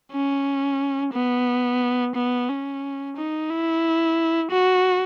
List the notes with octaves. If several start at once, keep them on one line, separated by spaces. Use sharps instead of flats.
C#4
B3
B3
C#4
D#4
E4
F#4